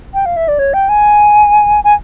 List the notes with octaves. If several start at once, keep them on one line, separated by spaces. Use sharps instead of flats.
G5
F5
E5
D5
C#5
G5
G#5
G#5